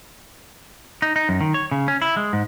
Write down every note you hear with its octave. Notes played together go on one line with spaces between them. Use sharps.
D#4
D#4
F#2
D#3
C#5
C#3
C#4
E4
G#3
G#2